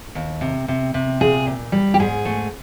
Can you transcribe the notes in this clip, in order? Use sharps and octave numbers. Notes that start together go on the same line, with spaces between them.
D#2
C3
C3
C3
A#2 G#4
A#2
G3
G4
G#2 G#4
A3